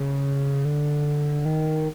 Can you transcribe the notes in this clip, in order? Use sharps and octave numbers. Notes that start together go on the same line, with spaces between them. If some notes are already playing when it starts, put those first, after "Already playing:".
Already playing: C#3
D3
D#3